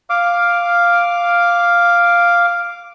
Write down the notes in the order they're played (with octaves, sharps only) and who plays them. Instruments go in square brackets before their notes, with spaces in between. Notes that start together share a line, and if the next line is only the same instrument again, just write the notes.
[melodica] F5 D6